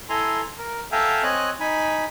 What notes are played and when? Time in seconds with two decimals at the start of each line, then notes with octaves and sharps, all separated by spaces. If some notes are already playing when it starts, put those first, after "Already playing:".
0.09 E4 A4 G#5 A#5 C6
0.58 A#4
0.92 A4 E5 F5 G5 G#5 A#5
1.23 C4 C#5 D#5 G#5 F#6
1.60 D#4 G#5 B5